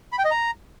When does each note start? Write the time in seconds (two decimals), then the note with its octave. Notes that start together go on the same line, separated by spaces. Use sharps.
0.12 B5
0.19 G5
0.25 D#5
0.31 A#5